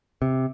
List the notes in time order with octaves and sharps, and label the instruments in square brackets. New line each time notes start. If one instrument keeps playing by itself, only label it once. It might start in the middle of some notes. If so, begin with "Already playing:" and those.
[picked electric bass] C3